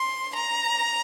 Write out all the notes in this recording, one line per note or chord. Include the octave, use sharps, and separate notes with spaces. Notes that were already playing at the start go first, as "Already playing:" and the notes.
Already playing: C6
A#5